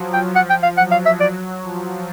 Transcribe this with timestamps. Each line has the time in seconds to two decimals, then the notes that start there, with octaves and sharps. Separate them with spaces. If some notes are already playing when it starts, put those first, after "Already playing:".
Already playing: F3 F#3
0.14 G5
0.36 F#5
0.50 G5
0.63 F5
0.78 F#3 F#5
0.92 F5
1.06 E5
1.20 D5
1.63 F3